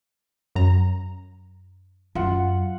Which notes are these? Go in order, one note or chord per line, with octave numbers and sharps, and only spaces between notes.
F#2 A#5
F#2 F4 F#5